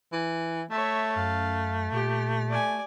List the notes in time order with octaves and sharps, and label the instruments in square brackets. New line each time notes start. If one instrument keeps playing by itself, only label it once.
[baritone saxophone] E3
[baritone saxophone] A3 [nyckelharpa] C#5 E5
[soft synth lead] F#2 [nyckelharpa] F5
[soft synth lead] A#2 [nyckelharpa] G4
[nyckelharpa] D5 G#5